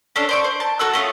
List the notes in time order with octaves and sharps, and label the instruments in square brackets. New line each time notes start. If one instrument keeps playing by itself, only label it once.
[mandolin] C#4 D4 A4
C5 D5 C#6
C5
A5
F#4 A4 F#5 E6
A3 C#4 F4 D#6